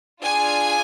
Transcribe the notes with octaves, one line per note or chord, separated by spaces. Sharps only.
D4 F4 G#4 G#5